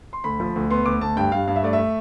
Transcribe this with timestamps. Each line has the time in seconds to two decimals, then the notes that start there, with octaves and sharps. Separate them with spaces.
0.13 C6
0.24 D2 B5
0.40 F3
0.56 D2
0.70 B3 C6
0.86 D2 D6
1.01 D2 A5
1.16 G2 G5
1.32 G2 F5
1.48 G2 F5
1.56 E5
1.63 A3 D5
1.73 A3 E5